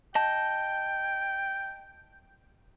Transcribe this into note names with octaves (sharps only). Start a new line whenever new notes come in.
D#5 G5 A5